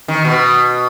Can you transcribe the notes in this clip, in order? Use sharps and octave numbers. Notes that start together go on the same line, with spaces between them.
D#3
B2